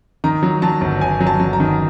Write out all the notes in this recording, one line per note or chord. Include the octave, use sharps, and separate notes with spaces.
D#3 A#5
F#3
F#3 A5
G1
G1 G#5
F#3
A5
F#3
A#5
D#3